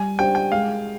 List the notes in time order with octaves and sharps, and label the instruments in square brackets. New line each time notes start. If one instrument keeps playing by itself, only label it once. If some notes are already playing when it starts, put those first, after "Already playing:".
Already playing: [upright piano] G3 [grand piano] G#5
[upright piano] D4 G4 C5 [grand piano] G5
[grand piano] G5
[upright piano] G#3 [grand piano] F5